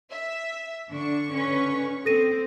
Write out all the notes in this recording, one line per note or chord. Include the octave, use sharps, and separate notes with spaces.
E5
D3 D4 C#6
C#4 B4
C4 A4 A#6 D#7